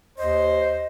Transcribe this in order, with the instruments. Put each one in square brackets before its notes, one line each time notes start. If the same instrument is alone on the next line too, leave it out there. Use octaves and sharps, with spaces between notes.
[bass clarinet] D#2 [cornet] C5 [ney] D#5